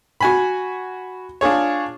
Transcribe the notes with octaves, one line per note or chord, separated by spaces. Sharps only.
F#4 G#5 B5
D4 F4 G#4 C#5